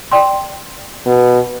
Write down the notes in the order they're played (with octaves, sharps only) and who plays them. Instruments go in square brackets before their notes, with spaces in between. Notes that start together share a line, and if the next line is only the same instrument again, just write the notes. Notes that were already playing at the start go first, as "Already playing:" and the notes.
[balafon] D5 G5 C6
[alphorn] B2